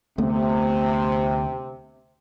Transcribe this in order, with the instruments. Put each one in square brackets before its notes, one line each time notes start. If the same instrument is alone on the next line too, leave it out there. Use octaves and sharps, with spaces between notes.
[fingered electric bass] D2 A3 B3 [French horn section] C3